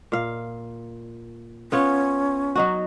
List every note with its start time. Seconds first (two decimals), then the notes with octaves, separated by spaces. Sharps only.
0.12 A#2 F5
1.72 B3 C#4 F4 C#5
2.55 F#3 D#4 F#4